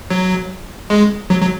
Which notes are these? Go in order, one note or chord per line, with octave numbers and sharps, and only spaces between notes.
F#3
G#3
F#3
F#3